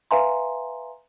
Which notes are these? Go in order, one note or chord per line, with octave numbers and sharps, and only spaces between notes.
B4 E5 F5 G#5 A#5 C6